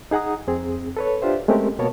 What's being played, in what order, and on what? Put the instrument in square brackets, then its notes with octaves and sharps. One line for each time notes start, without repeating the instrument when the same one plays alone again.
[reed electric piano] D#4 G#4 F#5 A#5 D#6
F2 C4 G#4
A4 B4 C#5
D4 F4 G4 C5 E5
G#3 A3 C4 C#4 G4 A#4
B2 A#3 B3 A#4 C#5 A5